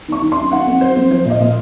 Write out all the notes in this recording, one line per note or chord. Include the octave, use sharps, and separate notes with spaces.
D#3 C#6
D#3
C6
F#2
D#3 F#5
F2
F#3 C5
F2
F3 C5
A#2 D#5
A#2